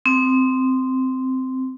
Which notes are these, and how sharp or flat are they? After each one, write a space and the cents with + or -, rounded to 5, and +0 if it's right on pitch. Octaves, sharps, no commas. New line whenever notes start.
C4 -10